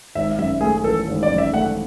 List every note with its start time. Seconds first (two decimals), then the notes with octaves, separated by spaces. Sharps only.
0.15 G#1 E5
0.39 F#2 E5
0.61 A3 G#4
0.84 E3 A4
1.07 G#1
1.23 D5
1.31 F#2
1.38 E5
1.53 A3 F#5